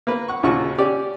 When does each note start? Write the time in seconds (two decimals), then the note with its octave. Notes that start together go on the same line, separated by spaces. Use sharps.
0.07 A#3 B4
0.28 F#5 C#6
0.43 D#2 A#2 C#3 F4 F#4 C#6
0.78 C#4 G4 C#5 D5